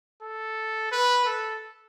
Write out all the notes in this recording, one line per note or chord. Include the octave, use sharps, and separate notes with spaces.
A4
B4
A4